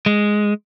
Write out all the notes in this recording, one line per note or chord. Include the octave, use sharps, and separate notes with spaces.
G#3